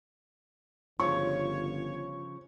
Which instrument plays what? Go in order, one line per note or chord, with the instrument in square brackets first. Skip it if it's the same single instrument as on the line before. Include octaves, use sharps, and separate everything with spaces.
[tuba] G1 [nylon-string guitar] C#3 F3 F4 [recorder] C#5 [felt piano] C#6